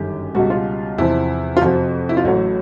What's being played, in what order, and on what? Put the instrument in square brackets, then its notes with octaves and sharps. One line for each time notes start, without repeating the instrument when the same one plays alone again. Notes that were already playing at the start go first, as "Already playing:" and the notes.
Already playing: [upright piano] G1 F#2 D#3 G3 G4
C#2 B2 G3 F#4
F4
E2 C3 F3 E4
F4
F2 C3 F3 F#4
E4
F4
A1 A2 F#3 F#4